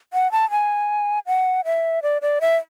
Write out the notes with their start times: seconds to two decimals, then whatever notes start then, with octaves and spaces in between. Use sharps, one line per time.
0.13 F#5
0.32 A5
0.51 G#5
1.27 F#5
1.65 E5
2.03 D5
2.22 D5
2.41 E5